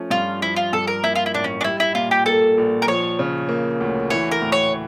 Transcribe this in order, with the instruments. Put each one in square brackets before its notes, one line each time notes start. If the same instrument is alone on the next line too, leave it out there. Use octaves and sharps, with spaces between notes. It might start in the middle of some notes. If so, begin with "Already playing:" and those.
Already playing: [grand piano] F3 A3 C#4
[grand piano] G2 [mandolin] F4
[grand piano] F3 [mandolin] E4
[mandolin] F4
[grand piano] G2 [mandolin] A4
[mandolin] A#4
[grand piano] A#3 [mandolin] E4
[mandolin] F4
E4
[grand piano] A1 [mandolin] D4
[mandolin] C#4
D4
[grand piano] G3 [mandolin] E4
[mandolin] E4
[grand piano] A#2 [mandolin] F4
[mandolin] G4
[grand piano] A#3 [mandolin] A4
[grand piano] A#1
[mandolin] A#4
[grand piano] F3 [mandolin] C#5
[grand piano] C#3
A#3
D2
[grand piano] E3 [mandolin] C#5
[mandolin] A#4
[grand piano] A2
[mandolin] C#5